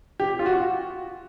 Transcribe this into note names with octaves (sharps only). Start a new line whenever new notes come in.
G4
F4
F#4